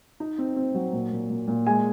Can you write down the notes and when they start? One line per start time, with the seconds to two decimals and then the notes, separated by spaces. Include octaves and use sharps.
0.20 D#4
0.38 C4
0.56 C4
0.75 F#3
0.93 A#2
1.11 A#2
1.30 A#2
1.48 A#2
1.67 G#3 G#5